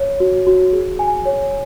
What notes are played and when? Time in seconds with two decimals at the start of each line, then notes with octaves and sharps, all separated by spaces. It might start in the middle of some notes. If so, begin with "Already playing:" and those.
Already playing: C#5
0.20 F#4
0.47 F#4
0.73 G#4
0.99 G#5
1.26 C#5